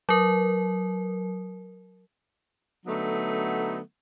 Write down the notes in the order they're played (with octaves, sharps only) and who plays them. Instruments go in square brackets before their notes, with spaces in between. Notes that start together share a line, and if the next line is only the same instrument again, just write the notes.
[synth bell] F#3 A#4
[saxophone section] D3 F#3 A3 B3 D#4